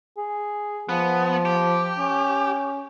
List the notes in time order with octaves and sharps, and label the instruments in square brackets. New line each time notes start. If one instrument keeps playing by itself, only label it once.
[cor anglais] G#4
[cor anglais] F3 [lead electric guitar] B3
[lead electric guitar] G4
[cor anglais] C#4